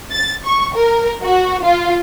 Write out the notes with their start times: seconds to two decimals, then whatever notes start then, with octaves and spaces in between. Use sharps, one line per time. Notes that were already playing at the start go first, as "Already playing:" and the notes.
0.12 A6
0.45 C#6
0.75 A#4
1.23 F#4
1.64 F4